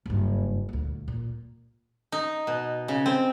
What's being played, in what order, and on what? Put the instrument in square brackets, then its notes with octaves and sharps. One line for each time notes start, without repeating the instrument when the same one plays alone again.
[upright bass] F#1 G2
D#1 D2
A#2
[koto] D#4
B2
C#3
C4